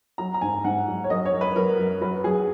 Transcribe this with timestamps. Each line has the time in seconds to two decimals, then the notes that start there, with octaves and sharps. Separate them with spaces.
0.18 F#3 A#5
0.34 A#5
0.41 G#2 G#5
0.64 G#2 F#5
0.87 F#3
1.04 C#5
1.10 F#2 D#5
1.26 C#5
1.33 F#2
1.41 B4
1.56 F#3 A#4
1.79 F#2
2.01 F#3 B4
2.24 F#3 G#4